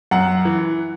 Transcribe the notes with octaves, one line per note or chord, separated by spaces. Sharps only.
F#2 F#5
E3